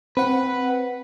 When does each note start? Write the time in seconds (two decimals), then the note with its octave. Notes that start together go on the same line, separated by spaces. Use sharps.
0.17 C4 B4 F#5